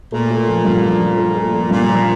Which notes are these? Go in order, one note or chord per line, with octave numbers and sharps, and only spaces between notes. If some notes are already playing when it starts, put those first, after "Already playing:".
A#2 A3
A3
F3
G2
F3
F3
A3
A3
F3
G2 A#2
F3